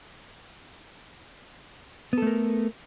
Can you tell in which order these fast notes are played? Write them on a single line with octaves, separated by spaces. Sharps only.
B3 A4 A3 A#4